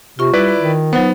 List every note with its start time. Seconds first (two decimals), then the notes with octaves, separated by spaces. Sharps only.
0.19 C3 F4 C#6
0.33 G3 E4 B4 D5
0.59 D#3
0.93 F#3 B3 D#4 C5